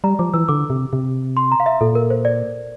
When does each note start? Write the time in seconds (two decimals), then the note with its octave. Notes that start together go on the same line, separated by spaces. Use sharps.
0.04 G3 A#5
0.19 F3 D6
0.34 E3 E6
0.48 D3 D6
0.70 C3
0.93 C3
1.37 C6
1.52 A#5
1.60 F5
1.66 E5
1.81 A#2 A4
1.95 A#4
2.10 C5
2.25 D5